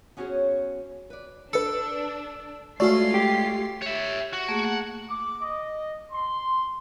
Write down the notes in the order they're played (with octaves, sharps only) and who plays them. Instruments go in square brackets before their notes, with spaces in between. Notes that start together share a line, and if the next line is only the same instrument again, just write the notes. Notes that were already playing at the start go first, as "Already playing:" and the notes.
[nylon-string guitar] B3 C#4 F#4 G#4 C5 C#5
B4 D5
[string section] D4 [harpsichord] A4 [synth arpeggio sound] B4 C#7
[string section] G#3 F4 C7 [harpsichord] A3 C#4 [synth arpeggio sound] F#4 D5
[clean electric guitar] G4
[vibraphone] G4 [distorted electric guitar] C#5 E5
[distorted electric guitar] F#4
[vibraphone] A3 A#3 G#4
[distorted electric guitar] F#5
[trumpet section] D6
D#5
C6